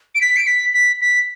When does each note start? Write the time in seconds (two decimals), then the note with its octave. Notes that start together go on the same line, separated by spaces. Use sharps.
0.15 D7
0.21 B6
0.36 D7
0.47 B6
0.74 B6
1.01 B6